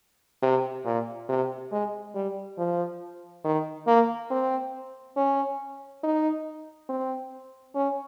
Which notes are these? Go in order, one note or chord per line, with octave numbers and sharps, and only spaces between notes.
C3
A#2
C3
G#3
G3
F3
D#3
A#3
C4
C#4
D#4
C4
C#4